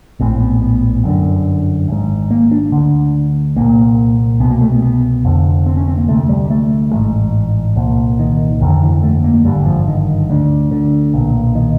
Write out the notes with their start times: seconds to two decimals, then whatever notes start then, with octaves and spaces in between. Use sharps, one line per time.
0.20 A#1 A2 C4
0.40 B3
0.62 B3
1.04 G1 F#2 D3
1.88 G#1 G#2
2.31 A#3
2.52 D4
2.72 D2 D3
3.56 C2 A#2 A#3
4.40 C2 B3
4.44 B2
4.51 A#3
4.61 A3
4.72 B3
4.82 B3
5.25 F1 F2 D3
5.66 C4
5.77 C#4
5.88 C4
5.98 A#3
6.08 D2 C3 A3
6.29 G3
6.50 A3
6.93 A1 G#2
7.76 C2 A#2
8.19 D#3
8.61 G1 F2 D3 D#3
8.82 E3
9.03 A3
9.24 A#3
9.45 G#1 G2 D3 G3
9.66 F3
9.88 D#3
10.29 D2 D3
10.71 D3
11.13 B1 A#2
11.55 D#3